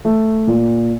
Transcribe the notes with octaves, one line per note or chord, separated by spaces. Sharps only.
A3
A#2